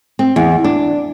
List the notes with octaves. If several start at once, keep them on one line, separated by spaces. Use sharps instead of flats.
C4
E2
D4